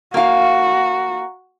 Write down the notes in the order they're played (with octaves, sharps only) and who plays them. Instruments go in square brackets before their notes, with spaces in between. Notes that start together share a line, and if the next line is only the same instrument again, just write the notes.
[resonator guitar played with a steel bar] A#3 F5 [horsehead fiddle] F#4